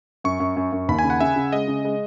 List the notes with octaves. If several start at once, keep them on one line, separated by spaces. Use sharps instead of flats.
F#2 C#6
F#2
F#2
F#2
D#2 B5
G#5
C#3
F#5
C#3 E5
C#3
G#3 D#5
C#3
G#3